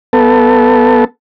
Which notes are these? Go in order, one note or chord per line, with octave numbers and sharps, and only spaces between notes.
B3 A4